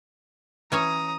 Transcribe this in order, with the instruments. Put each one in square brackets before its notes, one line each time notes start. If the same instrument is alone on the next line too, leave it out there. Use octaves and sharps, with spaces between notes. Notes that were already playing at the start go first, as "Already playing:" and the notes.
[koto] E3 C#4 C#5 [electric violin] A#5 D#6